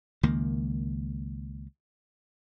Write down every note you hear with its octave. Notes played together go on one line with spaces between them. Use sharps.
C#2 D#3 A#3